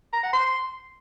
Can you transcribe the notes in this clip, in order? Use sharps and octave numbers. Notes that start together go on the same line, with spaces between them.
A#5
F#5
C6